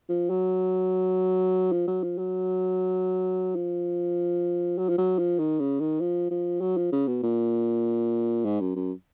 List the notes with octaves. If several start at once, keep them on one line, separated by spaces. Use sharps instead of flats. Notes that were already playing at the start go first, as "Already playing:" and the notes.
F3
F#3
F3
F#3
F3
F#3
F3
F#3
F3
F#3
F3
D#3
C#3
D#3
F3
F3
F#3
F3
C#3
B2
A#2
G#2
F#2
F#2